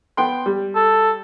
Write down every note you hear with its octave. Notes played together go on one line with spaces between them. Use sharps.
B3 G5 C6
G3
A4